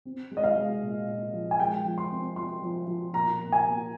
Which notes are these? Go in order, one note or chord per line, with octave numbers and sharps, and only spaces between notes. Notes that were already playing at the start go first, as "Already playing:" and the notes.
C4
G#3
D#5
F5
G#3
A#2
A#2
F3
G#5
G#3 G5
F3
C6
C4
F3 C6
F3
F3
A#2 A#5
A#3
G#5
A#3